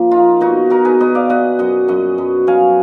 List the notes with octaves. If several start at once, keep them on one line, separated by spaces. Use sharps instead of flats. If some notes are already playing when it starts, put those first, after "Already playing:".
Already playing: F3 A#3
D#4 F4
B2 D#4 F#4
D#4 F#4 A#4
G#4 B4
B2 B4 D#5
D5 F5
B3 D#5 F#5
F#2 D#5 F#5
F#2 D#5 F#5
F#2
F#3 F5 G#5